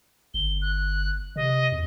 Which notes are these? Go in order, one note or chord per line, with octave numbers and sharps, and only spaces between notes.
G1 G7
F#6
C3 D#5
E2